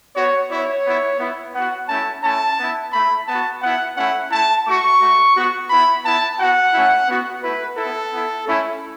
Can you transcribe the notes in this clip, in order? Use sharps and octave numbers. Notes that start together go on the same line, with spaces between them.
B3 F#4 C#5
B3 E4 C#5
B3 E4
B3 E4
B3 F#4 F#5
A3 C#4 E4 A5
A3 C#4 E4 A5
B3 E4
A3 E4 B5
B3 F#4 A5
B3 E4 F#5
A3 C#4 E4 F#5
A3 E4 A5
A3 F#4 C#6
A3 F#4
B3 F#4
B3 E4 B5
B3 E4 A5
B3 F#4 F#5
A3 C#4 E4
B3 F#4
A3 E4 B4
B3 E4 A4
B3 E4
A3 C#4 E4